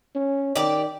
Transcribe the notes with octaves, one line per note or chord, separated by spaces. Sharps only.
C#4
D#3 G4 D5